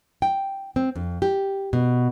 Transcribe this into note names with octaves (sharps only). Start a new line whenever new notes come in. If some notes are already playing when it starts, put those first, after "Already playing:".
G5
C4
F2
G4
B2